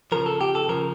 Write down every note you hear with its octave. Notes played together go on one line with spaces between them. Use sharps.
C#3 F3 A#4
A4
G4
A4
C#3 F3 A#4